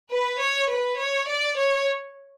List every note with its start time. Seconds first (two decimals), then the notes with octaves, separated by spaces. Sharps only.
0.12 B4
0.41 C#5
0.71 B4
1.00 C#5
1.30 D5
1.59 C#5